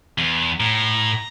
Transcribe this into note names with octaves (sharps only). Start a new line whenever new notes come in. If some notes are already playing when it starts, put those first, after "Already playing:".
E2
A2 A#5